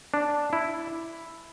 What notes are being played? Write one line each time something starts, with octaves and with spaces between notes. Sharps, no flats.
D4
E4